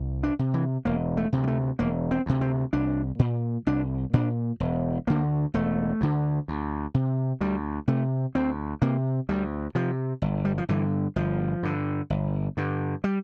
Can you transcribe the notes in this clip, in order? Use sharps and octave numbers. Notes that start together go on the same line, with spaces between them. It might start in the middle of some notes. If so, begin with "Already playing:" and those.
Already playing: C2
D4
C3
E3
E1 A#3
A3
D2 C3
G3
A3
E1 A#3
C4
D2 C3
C4
C2 D4
A#2
C2 D4
A#2 D4
E1
D2 D3 A#3
E1 A3
D2 D3
D2
C3
D2 G3
C3 A3
D2 C4
C3 A#3
D2 G3
C3 F3
G1
G3
F3
G2 D3 E3
G1 F3
G2 D3
G1
G2 D3
G3